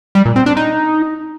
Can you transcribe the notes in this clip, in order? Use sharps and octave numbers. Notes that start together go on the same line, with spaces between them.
G3
A#2
C4
D4
D#4